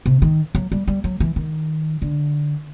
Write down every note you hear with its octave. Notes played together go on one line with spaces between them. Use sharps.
C3
D#3
F#3
G3
G3
F#3
E3
D#3
D3